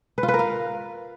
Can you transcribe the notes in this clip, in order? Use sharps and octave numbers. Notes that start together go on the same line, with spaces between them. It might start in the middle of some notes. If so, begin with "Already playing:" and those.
B4
F4
B4
A#4
F5